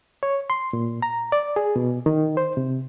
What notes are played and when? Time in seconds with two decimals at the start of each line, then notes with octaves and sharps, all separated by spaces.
0.23 C#5
0.50 C6
0.73 A#2
1.02 A#5
1.32 D5
1.56 G#4
1.76 B2
2.06 D#3
2.37 C5
2.57 C3